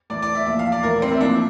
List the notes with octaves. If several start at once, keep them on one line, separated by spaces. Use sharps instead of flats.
A2 E3 D5
D5
E5
A#2 F3 E5
F5
D5
A2 E3 A#4
C4
E4
A#2 F3 D4